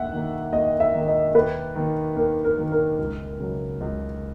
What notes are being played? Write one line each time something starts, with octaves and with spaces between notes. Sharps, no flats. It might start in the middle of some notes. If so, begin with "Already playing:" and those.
Already playing: D#2 E5 F#5
D#3 A#3
D#2 D#5
E5
D#3 A#3
D#5
D#2 B4
D#3 A#3
D#2 A#4
A#4
D#3 A#3
A#4
C#2
C#3 F#3
C#2